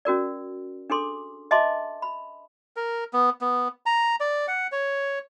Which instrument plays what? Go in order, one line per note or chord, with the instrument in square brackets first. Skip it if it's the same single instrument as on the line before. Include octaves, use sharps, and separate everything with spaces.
[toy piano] C#4 F#4 A#4 D5
D4 G#4 A4 C6 D6
D#5 E5 G#5 A5 C6 D6
B5
[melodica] A#4
B3
B3
A#5
D5
F#5
C#5